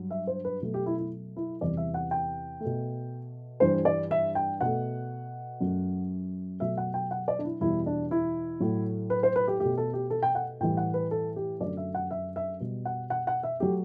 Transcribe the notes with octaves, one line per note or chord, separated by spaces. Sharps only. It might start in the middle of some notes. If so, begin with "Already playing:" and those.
Already playing: G2 F#3
E5
C5
B4
B2 F#3 A3
G4
E4
E4
E4
E2 C3 E3 G3 D5
E5
F#5
G5
A3
B2
G2 E3 G3 C5
D5
E5
G5
B2 A3 F#5
F#2 F#3 A3
B2 F#3 A3 E5
F#5
G5
F#5
D5
D4
E4
E2 B2 G3 E4
D4
E4
A2 F#3 A3
B4
C5
B4
G4
B2 A3 G4
A4
G4
A4
G5
F#5
A2 E3 G3 G5
F#5
B4
A4
G4
F#2 D3 F#3 A3 D5
E5
F#5
E5
E5
B2 G3
F#5
F#5
F#5
E5
F#3 A3 G4